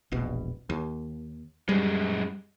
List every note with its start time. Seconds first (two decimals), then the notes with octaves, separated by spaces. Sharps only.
0.12 E1 A#1 B2
0.70 D#2
1.69 F#2 G3 G#3